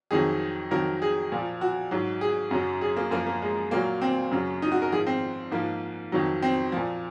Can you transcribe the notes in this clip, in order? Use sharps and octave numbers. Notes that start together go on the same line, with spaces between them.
F2 D#3 F#3 G#4
F2 D#3 F#3 A#4
G#4
A#2 F3
F#4
G#2 F#3
G#4
F#2 C#3 F#3
G#4
A#3
F#2 F3 A#3
A#3
G#3
A#2 F#3 A#3
C4
F#2 C#3 F#3
D#4
F#4
A#4
G#2 F3 G#4
C4
G#2 F3 A#3
F2 D#3 F#3
C4
A#2 F3